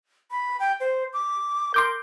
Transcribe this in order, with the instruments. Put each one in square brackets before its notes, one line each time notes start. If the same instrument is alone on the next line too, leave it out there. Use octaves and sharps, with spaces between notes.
[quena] B5
G5
C5
D6
[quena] A#4 [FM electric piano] C6 D6 G6